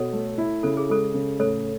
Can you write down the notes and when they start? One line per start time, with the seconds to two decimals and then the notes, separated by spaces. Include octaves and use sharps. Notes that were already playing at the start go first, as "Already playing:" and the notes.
Already playing: B2 A4 C#5
0.13 A3
0.38 E4
0.63 C#3 A4
0.77 G#4
0.89 G#3 A4
1.14 C#3
1.39 A2 A4 C#5